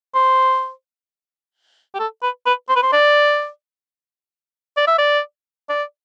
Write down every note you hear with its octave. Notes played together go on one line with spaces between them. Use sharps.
C5
G4
A4
B4
B4
C5
B4
C5
D5
D5
E5
D5
D5